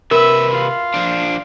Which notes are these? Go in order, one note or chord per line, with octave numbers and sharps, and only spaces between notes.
C3 A#4 B4 E5
F4
F3 D4